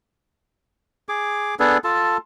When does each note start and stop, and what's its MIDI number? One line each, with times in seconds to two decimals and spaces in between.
1.09 1.55 68
1.09 1.55 86
1.60 1.78 59
1.60 1.78 62
1.60 1.78 68
1.60 1.78 69
1.84 2.17 65
1.84 2.17 69
1.84 2.17 81